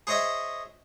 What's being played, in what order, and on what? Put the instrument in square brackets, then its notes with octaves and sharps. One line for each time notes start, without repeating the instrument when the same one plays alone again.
[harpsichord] G#4 C5 C#5 D#5 E5